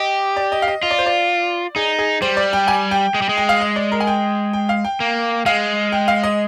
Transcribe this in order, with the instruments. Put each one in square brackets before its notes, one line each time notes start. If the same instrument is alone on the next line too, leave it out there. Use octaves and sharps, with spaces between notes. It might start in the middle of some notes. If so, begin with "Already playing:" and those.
Already playing: [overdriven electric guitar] G4 [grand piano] D#5
[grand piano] D5
D#5
F5
D#5
[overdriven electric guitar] F4 [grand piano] D#5
[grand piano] D5
C5
D5
[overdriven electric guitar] D#4 [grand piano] G#4
[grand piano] G#4
[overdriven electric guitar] G3 [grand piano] C5
[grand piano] D5
G5
G#5
G5
[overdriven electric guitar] G#3
G3
G#3
[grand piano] G5
F5
D#5
D5
A#4
G#5
G5
G5
F5
G5
[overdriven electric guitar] A#3
[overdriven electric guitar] G#3 [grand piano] F5
[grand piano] G5
F5
D#5